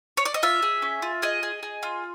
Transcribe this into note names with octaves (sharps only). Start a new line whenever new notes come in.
C#5
D5
D#5
F4 E5
G#4
C#4
F4
G#4 D#5
G#4
G#4
F4